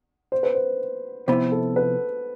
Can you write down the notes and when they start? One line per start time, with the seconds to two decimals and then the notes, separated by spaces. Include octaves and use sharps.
0.32 C5
0.43 B4
0.55 C5
1.27 C3 F3 B3 E4 C5
1.52 A4
1.76 B4